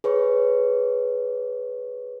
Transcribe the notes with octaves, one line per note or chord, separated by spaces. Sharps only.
G#4 B4 C#5 C#6